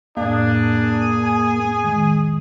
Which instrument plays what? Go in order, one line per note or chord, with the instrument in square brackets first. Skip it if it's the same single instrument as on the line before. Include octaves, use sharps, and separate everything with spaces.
[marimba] F2 A2 [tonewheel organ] A#3 [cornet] D4 [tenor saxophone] G#4
[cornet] G#5
[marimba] D#3 G#3